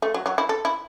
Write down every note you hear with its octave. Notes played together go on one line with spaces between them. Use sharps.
A3
F#3
F#3
E4
A4
E4